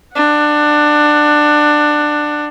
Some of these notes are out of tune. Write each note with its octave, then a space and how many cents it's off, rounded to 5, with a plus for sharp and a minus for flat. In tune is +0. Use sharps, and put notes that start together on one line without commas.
D4 +20 F#5 +0